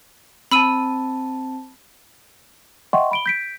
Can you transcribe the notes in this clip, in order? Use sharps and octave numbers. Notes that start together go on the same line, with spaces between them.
C4 A5 B5 E6 D#7
D#5 E5 F#5 G5 C6 C#6
B5 D7 G7
G6 B6 D7